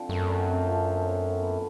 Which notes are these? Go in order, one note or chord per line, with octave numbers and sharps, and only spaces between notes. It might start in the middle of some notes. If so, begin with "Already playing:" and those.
Already playing: D3 F3 C4
F#2 A3
D3
C4
F3
D4
F#3
F#3
B3